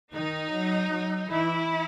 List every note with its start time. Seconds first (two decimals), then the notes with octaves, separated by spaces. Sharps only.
0.13 D#3 D#4
0.52 F#3
0.92 F#3
1.31 E3 E4